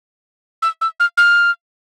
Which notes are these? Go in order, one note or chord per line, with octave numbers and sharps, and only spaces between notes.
E6
E6
F6
F6